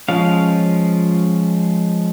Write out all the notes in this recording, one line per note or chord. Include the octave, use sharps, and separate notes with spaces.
F3 G#3 C#4 F5